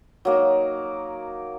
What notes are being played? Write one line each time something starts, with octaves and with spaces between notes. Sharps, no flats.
F#3 A#3 D#4